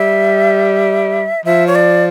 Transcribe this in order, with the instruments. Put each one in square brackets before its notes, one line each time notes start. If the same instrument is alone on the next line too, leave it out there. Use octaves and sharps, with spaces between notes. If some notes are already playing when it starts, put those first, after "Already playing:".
Already playing: [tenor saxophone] G3 [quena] E5
[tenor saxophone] F3 [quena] E5
[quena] C#5
D5